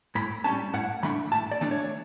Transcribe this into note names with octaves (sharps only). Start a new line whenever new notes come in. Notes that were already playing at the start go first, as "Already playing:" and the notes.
A2 B5
G3 C#4 A5
A2 F#5
E3 A3 D4 B5
A2 A5
D5
E3 A3 D4
C#5